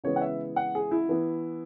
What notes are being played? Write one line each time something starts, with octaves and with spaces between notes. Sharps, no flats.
C#3 E3 G#3 B3 C#5
F#5
E5
F#5
G#4
E4
E3 B3